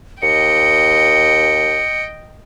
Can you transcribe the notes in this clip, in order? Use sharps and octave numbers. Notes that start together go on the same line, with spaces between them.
D#2 D#5 G5 C#7